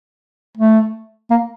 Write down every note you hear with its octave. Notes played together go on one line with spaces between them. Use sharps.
A3
A#3